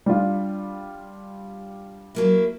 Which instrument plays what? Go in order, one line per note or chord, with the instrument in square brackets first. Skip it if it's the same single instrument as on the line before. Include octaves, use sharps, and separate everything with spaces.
[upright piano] G3 D4 F4
[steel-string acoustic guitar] F#3 A#3 E4